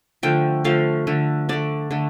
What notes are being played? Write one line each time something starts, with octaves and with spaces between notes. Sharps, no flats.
D3 F3 A3 G5
D3 F3 A3 F5
D3 A3
D3 A3 D5
D3 A3